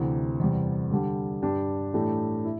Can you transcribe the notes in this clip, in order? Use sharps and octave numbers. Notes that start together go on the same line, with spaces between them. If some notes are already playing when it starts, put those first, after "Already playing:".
Already playing: D2 C3 E3
E2 C3 G3
D3 G3 D4 G4
G2 G3 D4 G4
A2 E3 A3 D4 G4
E4